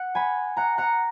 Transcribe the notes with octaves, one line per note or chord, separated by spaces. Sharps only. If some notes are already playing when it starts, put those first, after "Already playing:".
Already playing: F#5
G#5 B5
F#5 A#5
F#5 A#5